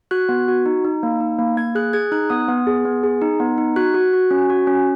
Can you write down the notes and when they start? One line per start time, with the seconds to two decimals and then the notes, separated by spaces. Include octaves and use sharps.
0.11 F#4 F#6
0.29 B3
0.48 F#4
0.66 D#4
0.85 D#4
1.03 A#3
1.20 D#4
1.39 A#3
1.57 A#3 G#6
1.75 G#4 F#6
1.93 G#4 G#6
2.12 D#4 F#6
2.30 B3 D#6
2.48 B3
2.67 G#4
2.85 B3
3.04 G#4
3.22 D#4
3.40 B3
3.58 D#4
3.76 F#4 F#6
3.94 F#4
4.13 F#4
4.31 C#4
4.50 F#4
4.67 C#4